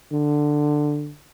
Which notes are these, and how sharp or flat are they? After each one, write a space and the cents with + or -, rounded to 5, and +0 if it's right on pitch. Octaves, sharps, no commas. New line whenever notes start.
D3 +10